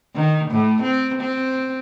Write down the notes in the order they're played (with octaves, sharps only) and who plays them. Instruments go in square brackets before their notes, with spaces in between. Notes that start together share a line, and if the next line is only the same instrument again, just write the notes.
[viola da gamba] D#3
A2
C4
C4